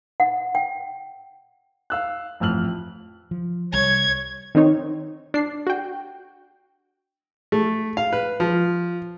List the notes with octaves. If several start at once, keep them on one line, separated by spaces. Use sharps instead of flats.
F#5
G5
F5 E6 F#6
A1 F2 E6 F6 F#7
F3
C2 G3 C#5 G#6
D#3 C4 D#4 C#5
D4 C7
F#4 G5
A3
F5
B4
F3